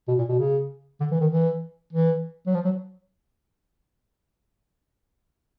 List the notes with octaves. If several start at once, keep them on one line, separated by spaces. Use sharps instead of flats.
B2
A#2
B2
C#3
D3
E3
D#3
E3
E3
F#3
F3
F#3